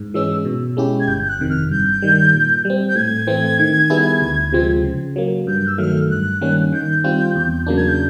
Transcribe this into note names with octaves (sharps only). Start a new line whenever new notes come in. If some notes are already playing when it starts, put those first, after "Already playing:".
Already playing: G#2
E3 G#3 C#4 E6
B2
G#3 C#4 E4 G4
G#6
G1 G6
G6
F#6
F2 C3 D#3
F6
G2 G6
D#3 G3
A#2
G3 C4
G6
A2 G#6
E3 A3 C4
D#3
G3 B3 E4 G#4
D2
C3 F3 G#3 C4
C#3
F#3 A#3
G2 G6
E6
D#3 F#3 A3 F6
G2 F#6
D#3 G3 A#3 C#4
D#3 G6
G3 C4 F4
E2
C#3 F#3 A#3 D4
G#6
G6